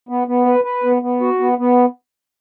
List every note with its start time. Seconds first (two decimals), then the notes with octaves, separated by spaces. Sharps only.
0.09 B3
0.27 B3
0.46 B4
0.64 B4
0.84 B3
1.02 B3
1.21 F#4
1.40 B3
1.58 B3